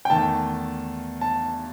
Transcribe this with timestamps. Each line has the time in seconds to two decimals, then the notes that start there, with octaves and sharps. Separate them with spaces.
0.05 G5
0.10 E2 D#3 A3 A5
1.21 A5